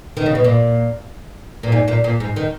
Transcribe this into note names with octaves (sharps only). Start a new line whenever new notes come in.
D#3
C#3
B2
A#2
A#2
G#2
A#2
A#2
G#2
D#3